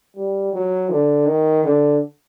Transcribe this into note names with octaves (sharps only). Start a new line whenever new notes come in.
G3
F#3
D3
D#3
D3